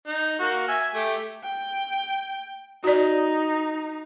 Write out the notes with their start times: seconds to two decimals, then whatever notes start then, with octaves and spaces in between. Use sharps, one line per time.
0.07 D#4
0.39 A#3 F#4
0.68 E5 G#5
0.94 A3 G4
1.44 G5
2.84 D#4 F#4 D5